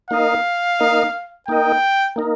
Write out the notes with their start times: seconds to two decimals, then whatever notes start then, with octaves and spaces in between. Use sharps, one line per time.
0.11 A#3 D#4 A#4 D#5 F5
0.80 A#3 D#4 A#4 D#5
1.48 A#3 D#4 A#4 D#5 G5
2.16 A#3 D#4 A#4